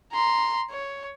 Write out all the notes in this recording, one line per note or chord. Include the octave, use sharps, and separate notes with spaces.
A#5 C6
C#5